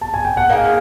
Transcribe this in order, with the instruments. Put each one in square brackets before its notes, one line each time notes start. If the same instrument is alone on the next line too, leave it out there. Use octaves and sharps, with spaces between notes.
[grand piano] A5
G#5
G5
F#5
[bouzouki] A#3 D#4 G#4 [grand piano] F5